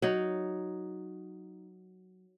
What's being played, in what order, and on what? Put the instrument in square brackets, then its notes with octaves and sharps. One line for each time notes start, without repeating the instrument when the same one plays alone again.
[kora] F#3 D#4